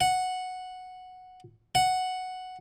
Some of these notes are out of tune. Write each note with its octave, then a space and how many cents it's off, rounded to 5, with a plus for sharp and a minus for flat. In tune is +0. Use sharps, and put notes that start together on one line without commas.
F#5 -5
F#5 +0